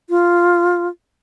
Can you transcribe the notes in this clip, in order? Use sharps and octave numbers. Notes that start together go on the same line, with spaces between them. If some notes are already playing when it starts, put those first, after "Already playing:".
F4